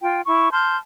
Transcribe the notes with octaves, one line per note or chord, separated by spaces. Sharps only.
F4 G5
E4 C#6
A5 C6 F6 G6